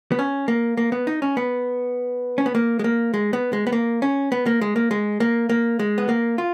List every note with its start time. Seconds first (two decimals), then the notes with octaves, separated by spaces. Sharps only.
0.12 B3
0.19 C#4
0.48 A#3
0.77 A#3
0.92 B3
1.07 D#4
1.22 C#4
1.37 B3
2.38 C#4
2.46 B3
2.55 A#3
2.79 G#3
2.84 A#3
3.14 G#3
3.33 B3
3.53 G#3
3.67 B3
3.72 A#3
4.02 C#4
4.32 B3
4.46 A#3
4.61 G#3
4.76 A#3
4.91 G#3
5.20 A#3
5.49 A#3
5.79 G#3
5.98 B3
6.09 A#3
6.38 F4